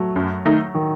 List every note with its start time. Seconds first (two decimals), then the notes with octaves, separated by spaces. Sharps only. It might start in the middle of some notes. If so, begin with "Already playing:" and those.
Already playing: F#3 A3
0.16 F#2
0.46 D#3 A3 D#4
0.74 D#3